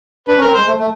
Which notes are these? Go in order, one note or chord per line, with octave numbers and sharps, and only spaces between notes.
D4 B4
C#4
A#4
C4
G#3 C5
A3
A3